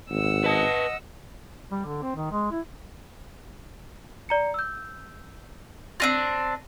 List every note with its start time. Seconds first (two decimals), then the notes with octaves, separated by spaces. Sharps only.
0.10 G#1 F#5 E6
0.44 B4 D#5 A5
1.71 G3
1.85 D3
2.02 C4
2.16 D#3
2.32 G#3
2.51 E4
4.29 D5 A#5 C#7
4.54 E6 G6
6.00 C4 D4 F4 A#6 D#7